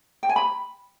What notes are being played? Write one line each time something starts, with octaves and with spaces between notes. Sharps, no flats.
G5
G#5
B5